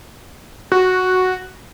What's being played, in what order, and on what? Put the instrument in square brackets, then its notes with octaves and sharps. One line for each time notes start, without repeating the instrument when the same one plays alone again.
[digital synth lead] F#4